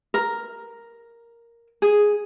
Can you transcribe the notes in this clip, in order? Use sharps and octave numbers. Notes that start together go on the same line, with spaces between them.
A#4
G#4